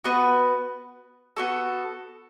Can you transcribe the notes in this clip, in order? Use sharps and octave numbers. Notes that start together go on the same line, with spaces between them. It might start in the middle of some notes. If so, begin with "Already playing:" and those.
B3 F#4 B4
B3 F#4 A4